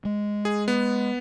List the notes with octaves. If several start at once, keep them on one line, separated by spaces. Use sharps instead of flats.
G#3
G#4
B3